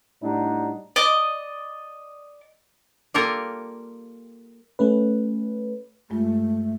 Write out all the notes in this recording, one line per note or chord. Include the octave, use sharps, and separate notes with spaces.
A2 G3 D4 D#4 F#4
D5 D#5
G3 A#3 F4 A4 A#4
A3 C#4 B4
G2 G#3 A3 F4